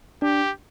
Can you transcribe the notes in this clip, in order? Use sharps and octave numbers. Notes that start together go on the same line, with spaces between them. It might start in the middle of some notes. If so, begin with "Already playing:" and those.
D4 G4